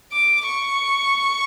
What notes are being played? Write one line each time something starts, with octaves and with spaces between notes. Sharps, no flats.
D6
C#6